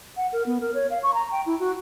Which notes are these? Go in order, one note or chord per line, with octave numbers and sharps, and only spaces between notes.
F#5
A#4
B3
A#4
C#5
F5
C#6
A#5
G5
E4
F#4